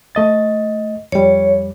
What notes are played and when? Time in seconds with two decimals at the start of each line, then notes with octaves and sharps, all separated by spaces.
0.15 A3 D#5 A6
1.12 F2 G3 C#5